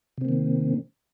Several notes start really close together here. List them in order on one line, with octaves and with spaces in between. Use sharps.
C3 C4 A#3 D#3